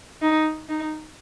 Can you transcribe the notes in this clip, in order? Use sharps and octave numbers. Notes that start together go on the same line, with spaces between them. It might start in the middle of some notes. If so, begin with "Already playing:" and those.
D#4
D#4